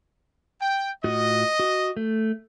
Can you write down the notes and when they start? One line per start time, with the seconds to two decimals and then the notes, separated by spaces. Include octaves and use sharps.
0.61 G5
1.04 A2 F4 F#4 D#5
1.60 F#4
1.97 A3